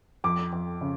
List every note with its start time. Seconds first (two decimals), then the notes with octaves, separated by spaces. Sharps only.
0.24 F2 D6
0.53 F2
0.81 C#3